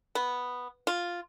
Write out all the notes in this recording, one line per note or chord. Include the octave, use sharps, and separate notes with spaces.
B3
F4